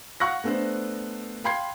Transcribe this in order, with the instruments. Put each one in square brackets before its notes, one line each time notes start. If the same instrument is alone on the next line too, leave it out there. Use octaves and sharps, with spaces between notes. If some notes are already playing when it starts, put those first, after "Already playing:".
[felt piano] F5 F#5 C#6 F#6 A#6
A3 B3 D4 A4 C5
F5 G5 B5 C6 G#6 C7